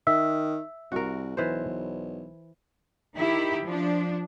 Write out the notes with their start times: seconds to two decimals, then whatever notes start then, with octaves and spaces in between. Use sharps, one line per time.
0.07 D#3 E5
0.92 C2 F#4 A#4
1.37 B1 E3 C5
3.15 D#3 E4 G4
3.63 F3 D4